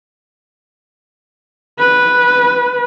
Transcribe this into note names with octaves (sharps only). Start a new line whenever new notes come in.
B4